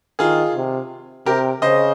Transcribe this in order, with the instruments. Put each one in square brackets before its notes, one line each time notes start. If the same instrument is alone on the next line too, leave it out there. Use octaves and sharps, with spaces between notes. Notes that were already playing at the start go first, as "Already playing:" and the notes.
[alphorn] D#3 [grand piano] F4 G#4
[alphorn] C3
[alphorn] C3 [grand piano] G4 A#4
[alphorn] C#3 [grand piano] C5 D#5